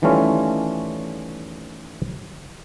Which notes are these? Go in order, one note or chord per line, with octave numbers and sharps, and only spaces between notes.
D#3 E3 G3 A3 C#4 F4